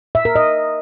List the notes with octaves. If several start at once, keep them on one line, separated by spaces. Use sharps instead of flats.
E5
A#4
D#5